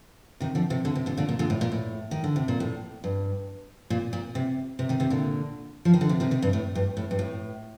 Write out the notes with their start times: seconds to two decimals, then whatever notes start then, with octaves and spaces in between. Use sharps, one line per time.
0.40 C3 D#3
0.55 D3 F3
0.70 C3 D#3
0.85 A#2 D3
0.95 C3
1.06 A#2 D3
1.17 A#2 D3
1.29 A#2
1.39 A#2 D3
1.50 A2
1.61 A#2
1.72 A2
2.11 D#3
2.24 D3
2.36 C3
2.48 A#2
2.60 A2
3.04 G2
3.90 A#2
4.13 A#2
4.35 C3
4.79 C3
4.89 C3 D#3
5.00 C3 D#3
5.10 A#2 D3
5.85 F3
5.94 D#3
6.01 D3
6.09 C3
6.20 C3 D#3
6.31 C3 D#3
6.42 G2
6.53 A2
6.75 G2
6.97 A2
7.11 G2
7.19 A2